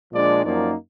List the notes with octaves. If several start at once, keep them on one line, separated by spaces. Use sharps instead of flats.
A#2 F3 G#3 D4 D5
F#2 F3 A#3 D#4 D5